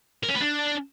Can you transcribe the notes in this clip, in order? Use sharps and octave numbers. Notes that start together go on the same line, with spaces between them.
A#4
C#4
B4
D4